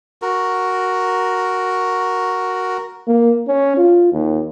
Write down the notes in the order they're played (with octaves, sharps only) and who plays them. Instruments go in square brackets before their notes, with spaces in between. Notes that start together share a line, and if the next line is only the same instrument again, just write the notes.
[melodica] F#4 A#4
[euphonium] A#3
C#4
F4
D#2